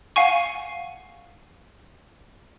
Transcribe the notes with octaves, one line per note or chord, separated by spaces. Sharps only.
F5 F#5 G#5 C#6